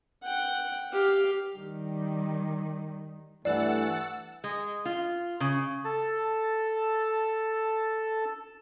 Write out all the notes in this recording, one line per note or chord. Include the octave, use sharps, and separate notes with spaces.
F#5 G5
G4 F5
D#3 G3
G2 E3 A3 D5 F#5 E6 A6
G#3
F4
C#3
A4 A5